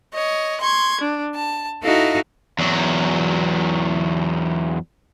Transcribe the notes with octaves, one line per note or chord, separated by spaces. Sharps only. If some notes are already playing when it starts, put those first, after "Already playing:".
C#5 D#5
C6 C#6 G#6
D4
A5
D#4 E4 F#4 A4 D#5 F5
E2 F#3